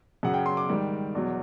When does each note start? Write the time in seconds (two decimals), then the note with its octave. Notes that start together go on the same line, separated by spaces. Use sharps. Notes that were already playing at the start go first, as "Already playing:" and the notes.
0.23 F#2 C#3 F#3 F#5
0.34 G5
0.46 C6
0.57 D6
0.69 G#2 D#3 G3
1.15 E2 B2 F#3